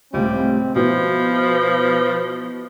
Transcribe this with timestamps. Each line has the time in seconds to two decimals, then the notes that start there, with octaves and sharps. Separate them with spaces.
0.13 C#2 A2 C3 G3 C4
0.76 B2 F3 E4 B4 G6